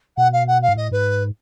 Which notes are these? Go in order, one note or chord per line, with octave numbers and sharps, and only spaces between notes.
B2 F#5
F5
F#5
F5
G#2
A2 D#5
G#2 B4